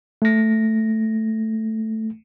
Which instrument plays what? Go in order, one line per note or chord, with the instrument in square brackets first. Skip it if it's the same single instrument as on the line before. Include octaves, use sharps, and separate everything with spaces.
[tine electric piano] A3 A#6